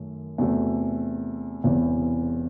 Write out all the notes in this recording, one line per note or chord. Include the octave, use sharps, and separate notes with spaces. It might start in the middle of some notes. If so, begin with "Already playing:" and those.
Already playing: F#2 D#3 A3
E2 C3 F#3 A3
E1 E2 C3 E3